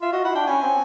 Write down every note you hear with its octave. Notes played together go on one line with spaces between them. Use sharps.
F4 E5
F#4 D#5
E4 F#5
D4 G5
C#4 G#5
C4